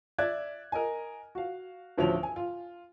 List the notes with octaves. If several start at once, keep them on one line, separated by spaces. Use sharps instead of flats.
D5 E5 F#6 G#6
A#4 D#5 G#5
F#4 F5
A1 D2 F3 F#4 C#5 F7
G#5
F4